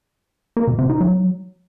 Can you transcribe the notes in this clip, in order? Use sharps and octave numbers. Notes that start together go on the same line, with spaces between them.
A#3
B2
C3
D#4
F#3